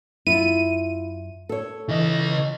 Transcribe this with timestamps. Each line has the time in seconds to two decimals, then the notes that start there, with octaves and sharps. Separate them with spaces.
0.27 F#2 E4 F4 D#7
1.49 A4 C#5
1.88 C#3 E3 D#5